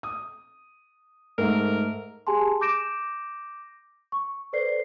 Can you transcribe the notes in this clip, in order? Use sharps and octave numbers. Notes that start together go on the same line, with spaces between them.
D#6
G#2 A3 A#4
G4 G#4 G#5 A5 C6
D6 G6 A#6 D7 E7
C#6
A4 B4 C5 D5 C7